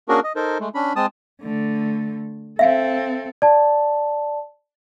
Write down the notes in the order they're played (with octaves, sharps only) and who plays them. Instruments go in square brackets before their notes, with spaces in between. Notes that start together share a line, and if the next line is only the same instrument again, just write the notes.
[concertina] A#3 C#4 D4 F#4 G#4 A#4
D#5
D#4 A4 A#4 C5
G#3 A3
C#4 D4 B5
G#3 C4 A5 D#6
[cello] D3 A3
[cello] C4 A4 [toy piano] E5 F5
[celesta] D5 A5